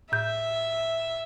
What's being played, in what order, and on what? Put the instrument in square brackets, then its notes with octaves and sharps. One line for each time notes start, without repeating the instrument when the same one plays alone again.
[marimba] A2 G6 [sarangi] E5